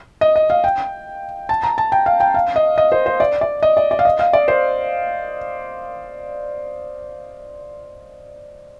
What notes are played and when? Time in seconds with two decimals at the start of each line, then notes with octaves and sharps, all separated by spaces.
0.21 D#5
0.36 D#5
0.50 F5
0.64 G5
1.49 A5
1.63 A#5
1.78 A5
1.92 G5
2.06 F5
2.20 G5
2.34 F5
2.56 D#5
2.78 D#5
2.92 C5
3.06 C5
3.20 D5
3.41 D5
3.63 D#5
3.77 D5
3.91 D5
3.99 F5
4.05 D#5
4.19 F5
4.33 D5
4.48 C5